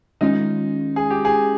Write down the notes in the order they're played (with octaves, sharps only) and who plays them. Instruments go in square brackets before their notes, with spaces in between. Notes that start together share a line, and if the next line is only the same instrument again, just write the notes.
[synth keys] D#3 G#3 C#4 F4 [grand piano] D#4
[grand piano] G#4
G4
G#4